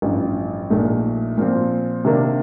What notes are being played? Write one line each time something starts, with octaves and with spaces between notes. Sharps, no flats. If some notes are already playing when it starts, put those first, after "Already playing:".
A1 G2 F3
A#1 A#2 A3 D#4
A#2 F3 C4
C3 D#3 A#3 D4